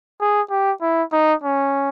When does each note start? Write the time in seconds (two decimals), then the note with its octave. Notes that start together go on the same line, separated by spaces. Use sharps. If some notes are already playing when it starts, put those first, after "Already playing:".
0.20 G#4
0.50 G4
0.82 E4
1.12 D#4
1.43 C#4